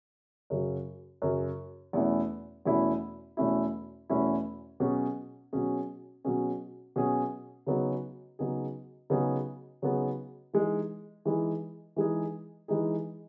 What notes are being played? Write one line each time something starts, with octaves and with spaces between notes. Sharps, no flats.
F#2 C#3 F#3
F#2 C#3 F#3
E2 B2 A3 C#4 E4
E2 B2 A3 C#4 E4
E2 B2 A3 C#4 E4
E2 B2 A3 C#4 E4
B2 F#3 C#4 G#4
B2 F#3 C#4 G#4
B2 F#3 C#4 G#4
B2 F#3 C#4 G#4
C#3 F#3 B3 D#4 G#4
C#3 F#3 B3 D#4 G#4
C#3 F#3 B3 D#4 G#4
C#3 F#3 B3 D#4 G#4
E3 G#3 D#4 G#4
E3 G#3 D#4 G#4
E3 G#3 D#4 G#4
E3 G#3 D#4 G#4